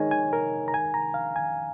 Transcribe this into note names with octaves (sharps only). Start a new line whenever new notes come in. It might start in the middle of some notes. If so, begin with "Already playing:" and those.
Already playing: D#3 G#3 D#4 C#5 G#5
G#5
A#4
A#5
G#5
A#5
F5
G#5